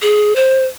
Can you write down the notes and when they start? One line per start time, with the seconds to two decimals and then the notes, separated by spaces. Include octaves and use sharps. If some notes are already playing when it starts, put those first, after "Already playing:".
0.02 G#4
0.36 C5